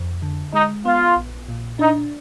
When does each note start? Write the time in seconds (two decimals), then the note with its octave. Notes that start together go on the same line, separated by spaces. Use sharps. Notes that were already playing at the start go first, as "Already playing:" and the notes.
Already playing: F2
0.22 D3
0.53 G#3 D#4
0.85 B3 F4
1.16 A#1
1.49 A#2
1.79 D4 D#4